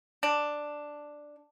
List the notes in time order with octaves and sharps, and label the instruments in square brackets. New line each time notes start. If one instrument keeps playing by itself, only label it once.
[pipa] D4